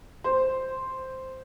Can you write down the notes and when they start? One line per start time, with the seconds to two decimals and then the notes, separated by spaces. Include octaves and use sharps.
0.24 C5